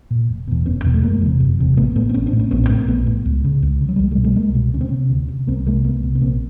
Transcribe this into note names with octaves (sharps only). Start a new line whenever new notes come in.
A#2
F1
E2 B2
F1 B3 C#4
E2 B2
A3
F#1 G#3 A#3
E2 C3
F#1
E2 C3
A1 A3 B3
A2 A3 B3
C4
A1 B3 C#4
C4 D4
A2
B3 C#4
A#1 B3 C#4
A#3 C4
A2 C#4
A#3 C4
A#1 A3 B3
A2
C#2
C#3
C#2
C#3
F#3
G3
C2 G#3
G3 A3
B2
G3 A3
C2 G#3 A#3
B2
D2 C#4
C4
C3 B3 C#4
D2
C3
C2 A#3 C4
C3 G#3 A#3
C2 A3 B3
C3
B3
A#1 A#3 C4